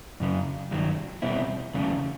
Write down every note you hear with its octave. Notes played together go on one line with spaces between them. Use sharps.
F#2 C#3 F#3
G2 D#3 F#3
E2 B2 G3 C4 E4
E2 C#3 F#3 A3 C#4